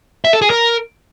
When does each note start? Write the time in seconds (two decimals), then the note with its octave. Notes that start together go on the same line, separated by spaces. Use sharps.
0.25 E5
0.33 A4
0.42 G#4
0.50 A#4